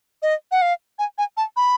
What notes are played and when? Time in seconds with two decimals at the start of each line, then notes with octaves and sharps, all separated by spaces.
0.22 D#5
0.52 F#5
0.62 F5
0.99 G#5
1.18 G#5
1.37 A5
1.57 B5